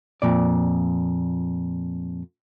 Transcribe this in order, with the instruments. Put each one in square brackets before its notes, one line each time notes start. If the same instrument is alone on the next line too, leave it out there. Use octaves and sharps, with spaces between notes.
[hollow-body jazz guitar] F2 A#2 D5